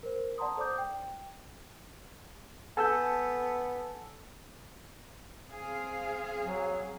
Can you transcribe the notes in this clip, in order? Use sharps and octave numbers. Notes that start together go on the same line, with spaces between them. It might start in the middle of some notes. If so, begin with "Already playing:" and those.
A#4 C5
D5 F#5 A5 A#5 C6 D#6
A4 C5 D5 D6 D#6 G6
G5
B3 A4 G#5 E6 G6
C4 G#4 F5
F#3